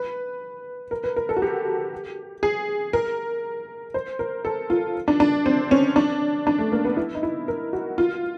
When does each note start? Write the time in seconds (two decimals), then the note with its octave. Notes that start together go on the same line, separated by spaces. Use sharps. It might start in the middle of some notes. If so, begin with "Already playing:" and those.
Already playing: B4
0.91 A#4
1.04 B4
1.16 A#4
1.29 A4
1.37 F#4
1.42 G4
2.43 G#4
2.93 A#4
3.94 C5
4.19 A#4
4.45 A4
4.70 F4
5.08 D4
5.20 D4
5.46 C4
5.71 C#4
5.96 D4
6.47 D4
6.59 A3
6.72 A#3
6.85 B3
6.97 E4
7.15 D#4
7.23 E4
7.48 A#4
7.73 F#4
7.98 F4